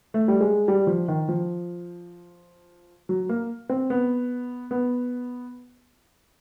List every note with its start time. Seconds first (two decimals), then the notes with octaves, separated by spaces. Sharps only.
0.14 A3
0.28 G3
0.41 G#3
0.68 G3
0.87 F3
1.08 D#3
1.29 F3
3.09 F#3
3.29 A#3
3.69 C4
3.90 B3
4.71 B3